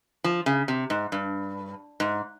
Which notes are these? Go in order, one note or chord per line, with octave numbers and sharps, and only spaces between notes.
F3
C#3
C3
G#2
G2
G#2